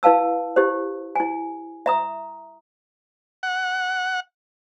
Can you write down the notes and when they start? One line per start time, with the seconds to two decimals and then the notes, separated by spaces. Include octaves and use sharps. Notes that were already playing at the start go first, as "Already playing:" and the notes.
0.03 E4 B4 F5 A5 E6
0.56 E4 G4 C5
1.15 E4 G#5
1.86 E5 A#5 D#6
3.43 F#5